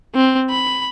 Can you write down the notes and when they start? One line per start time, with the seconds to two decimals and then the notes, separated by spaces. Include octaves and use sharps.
0.15 C4
0.50 B5